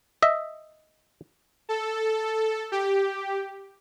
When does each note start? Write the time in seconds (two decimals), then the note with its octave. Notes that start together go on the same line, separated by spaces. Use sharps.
0.22 D#5 E5
1.69 A4
2.72 G4